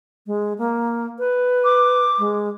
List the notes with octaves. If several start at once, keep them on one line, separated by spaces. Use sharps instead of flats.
G#3
A#3
B4
D6
G#3